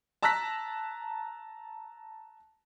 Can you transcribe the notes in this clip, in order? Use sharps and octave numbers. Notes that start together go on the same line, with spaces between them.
A5 A#5 E6 F#6 A#6 B6